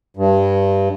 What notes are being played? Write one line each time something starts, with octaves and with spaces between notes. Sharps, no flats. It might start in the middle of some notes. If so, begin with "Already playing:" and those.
G2